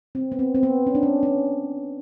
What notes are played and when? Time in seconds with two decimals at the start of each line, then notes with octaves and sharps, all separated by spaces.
0.15 C4
0.32 B3
0.39 C4
0.55 C4
0.63 B3
0.87 C#4
0.95 D4
1.03 C#4
1.23 C#4